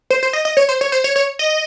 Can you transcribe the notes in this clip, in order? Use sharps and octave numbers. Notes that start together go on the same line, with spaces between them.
C5
C5
D#5
D#5
C#5
C5
C#5
C5
C#5
C#5
D#5